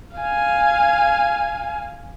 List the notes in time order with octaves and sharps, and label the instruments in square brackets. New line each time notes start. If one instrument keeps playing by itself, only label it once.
[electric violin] F5 G#5